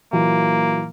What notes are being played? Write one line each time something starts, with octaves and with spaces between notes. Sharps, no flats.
A#2 E3 F#3 A#3